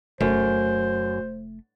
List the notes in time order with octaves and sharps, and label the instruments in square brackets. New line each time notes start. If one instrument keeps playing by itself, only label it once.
[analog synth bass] F1 [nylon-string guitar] F#2 [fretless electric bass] A3 [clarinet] C5